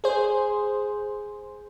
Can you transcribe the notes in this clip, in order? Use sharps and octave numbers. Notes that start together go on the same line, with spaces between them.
G#4 C5